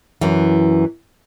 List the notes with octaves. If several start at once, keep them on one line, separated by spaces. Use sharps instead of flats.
F#2 E3